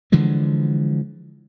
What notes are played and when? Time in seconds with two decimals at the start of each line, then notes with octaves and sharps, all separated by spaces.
0.12 D3 E3 F3 G#3